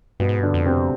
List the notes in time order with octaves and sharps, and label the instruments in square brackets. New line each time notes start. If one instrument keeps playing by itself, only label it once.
[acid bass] G2 [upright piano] B2 B3
[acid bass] G#2
[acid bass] G2 [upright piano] D3 D4
[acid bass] F2
[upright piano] C3 C4